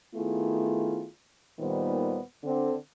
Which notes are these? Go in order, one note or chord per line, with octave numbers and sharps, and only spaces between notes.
D#3 A3 B3 E4 F4 G#4
D#2 A#2 D#3 G3 B3 C5
D3 C4